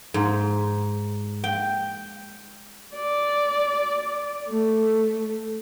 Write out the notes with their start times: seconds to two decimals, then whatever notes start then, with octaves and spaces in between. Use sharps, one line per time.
0.14 G#2
1.44 G5
2.96 D5
4.49 A3